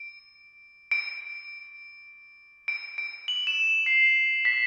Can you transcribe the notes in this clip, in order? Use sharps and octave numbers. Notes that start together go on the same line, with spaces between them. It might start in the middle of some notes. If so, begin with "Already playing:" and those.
Already playing: D7
D7
D7
D7
F#7
E7
C7
B6